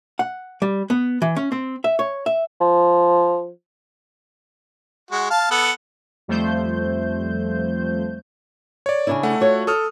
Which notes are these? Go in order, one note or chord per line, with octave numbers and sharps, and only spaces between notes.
F#5
G3
B3
E3
C#4
C4
E5
C#5
E5
F3
G#3 F#4
F5 A5
B3 A4 F#5
F2 F3 G3 A3 C5 G6
C#5 D5
C#3 D4 E4
A3 F#5
F4 F#4 C#5
A4 D#6 F6